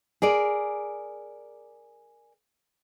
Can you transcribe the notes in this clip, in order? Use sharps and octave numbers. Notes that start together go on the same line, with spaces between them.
G#4 A#4 D5